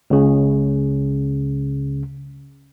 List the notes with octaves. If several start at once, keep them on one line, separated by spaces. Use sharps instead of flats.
C#2 C#3